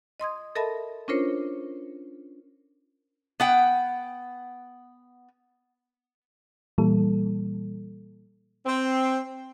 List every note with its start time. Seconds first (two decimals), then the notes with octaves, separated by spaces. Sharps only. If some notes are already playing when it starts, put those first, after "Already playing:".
0.20 D#5 C6 D#6 G#6
0.55 A4 A#4 D#5 E5 A5 B5
1.08 C#4 D4 F4 A#4 C5 C#5
3.40 B3 F#5 G5
6.78 A#2 E3 G3 A#3 A4
8.66 C4